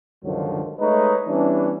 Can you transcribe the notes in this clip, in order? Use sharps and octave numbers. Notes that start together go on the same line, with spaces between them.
C#2 G2 D3 D#3 F3 F#3
G#3 A3 D#4 B4 C#5 D#5
E3 G3 B3 C#4 D4